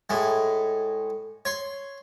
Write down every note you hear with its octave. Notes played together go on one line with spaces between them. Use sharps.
A2 G#3
C#5 C6